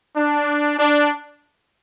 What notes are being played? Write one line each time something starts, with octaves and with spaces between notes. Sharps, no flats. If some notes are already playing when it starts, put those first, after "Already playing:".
D4
D4